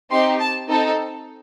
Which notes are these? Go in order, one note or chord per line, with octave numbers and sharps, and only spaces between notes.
C4 D#4 G4 C6
A5
C4 D#4 A4